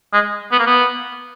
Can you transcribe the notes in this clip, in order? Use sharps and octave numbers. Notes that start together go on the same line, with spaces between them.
G#3
B3
A#3
B3